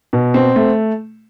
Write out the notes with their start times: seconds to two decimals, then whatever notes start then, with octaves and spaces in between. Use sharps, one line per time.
0.13 B2
0.34 C4
0.56 A3